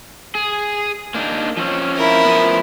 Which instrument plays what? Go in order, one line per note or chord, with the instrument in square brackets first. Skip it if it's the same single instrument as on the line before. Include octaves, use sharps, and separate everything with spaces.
[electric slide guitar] G#4
A#3 D4 D#4
F3 C4 C#4
[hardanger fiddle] E4 A#4
[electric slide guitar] F3 B3